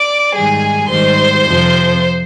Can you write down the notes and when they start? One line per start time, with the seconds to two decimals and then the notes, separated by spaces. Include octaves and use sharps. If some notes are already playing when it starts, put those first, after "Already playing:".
Already playing: D5 D6
0.34 G#2 D#3 G3 G#4 G#5
0.90 G#2 D#3 G3 C5 C6
1.46 F2 C3 F3